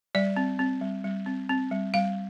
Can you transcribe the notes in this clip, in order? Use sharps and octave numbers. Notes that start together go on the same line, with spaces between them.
G3 D5
C4
C4
G3
G3
C4
C4
G3
G3 F5